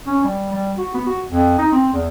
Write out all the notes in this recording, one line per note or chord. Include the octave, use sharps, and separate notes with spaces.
C#4
G3
G3
F#4
B3
F#4
F2
D#4
C4
E2